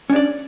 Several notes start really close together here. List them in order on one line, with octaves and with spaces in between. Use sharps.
C#4 D4 D5